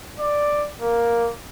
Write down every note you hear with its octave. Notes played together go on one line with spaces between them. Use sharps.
D5
A#3